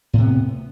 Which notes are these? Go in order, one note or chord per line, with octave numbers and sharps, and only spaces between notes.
A2 C3 B3